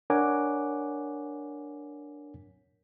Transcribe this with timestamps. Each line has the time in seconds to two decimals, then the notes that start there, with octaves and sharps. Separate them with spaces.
0.10 D4 A#4 C#5 F#5 G#5 D6